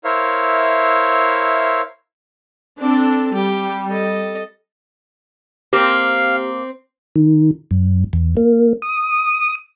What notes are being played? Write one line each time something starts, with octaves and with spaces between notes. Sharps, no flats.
E4 A#4 C5 C#5 E5 F5
C4 D4 A4
G3 G4
A4 D#5
A#3 C4 G4 F5
D#3
F#2
E2
A#3
D#6